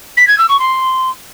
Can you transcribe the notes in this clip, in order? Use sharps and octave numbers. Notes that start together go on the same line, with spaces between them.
B6
G#6
E6
C#6
C6